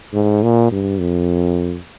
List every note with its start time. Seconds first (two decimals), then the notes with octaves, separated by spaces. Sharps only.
0.13 G#2
0.43 A#2
0.71 G2
1.00 F2